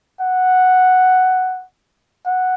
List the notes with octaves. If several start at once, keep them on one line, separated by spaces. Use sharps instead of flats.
F#5
F#5